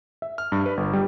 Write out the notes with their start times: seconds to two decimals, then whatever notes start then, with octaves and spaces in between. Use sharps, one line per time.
0.22 E5
0.38 F6
0.52 G2
0.66 B4
0.77 G1
0.93 G3